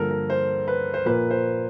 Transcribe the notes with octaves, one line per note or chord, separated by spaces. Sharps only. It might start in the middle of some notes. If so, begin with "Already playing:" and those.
Already playing: G2 D3 F3 A#3 A4 A#4
A#4
C5
B4
C5
A#2 F3 A#3 B4
C5